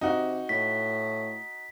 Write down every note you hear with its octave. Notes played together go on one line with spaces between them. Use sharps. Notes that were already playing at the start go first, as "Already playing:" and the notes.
C3 D#4 F#4
A2 B6